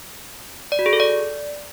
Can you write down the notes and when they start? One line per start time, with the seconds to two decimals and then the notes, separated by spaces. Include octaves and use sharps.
0.72 D5
0.79 F#4
0.86 G#4
0.93 A4
1.00 D5